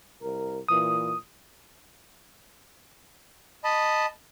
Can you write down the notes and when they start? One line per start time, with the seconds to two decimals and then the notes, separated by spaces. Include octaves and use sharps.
0.22 C2 A#4
0.69 A#2 E3 D#6
3.64 D#5 A5 B5